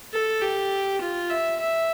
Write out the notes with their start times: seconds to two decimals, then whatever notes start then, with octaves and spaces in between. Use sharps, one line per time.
0.13 A4
0.42 G4
1.01 F4
1.30 E5
1.60 E5